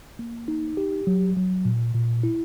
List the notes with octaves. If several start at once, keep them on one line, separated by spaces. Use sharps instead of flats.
A#3
D#4
G4
F#3
F#3
A#2
A#2
E4